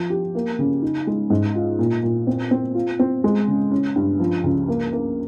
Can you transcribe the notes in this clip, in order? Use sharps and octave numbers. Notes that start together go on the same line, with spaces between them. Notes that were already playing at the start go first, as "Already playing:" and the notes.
Already playing: F3
G4
A#3
C#3
D#4
G#3
G#2
F4
A#2
A#2
C4
C4
F4
C4
G#3
C#3
C#4
G2
F3
C#2
A#3
A#3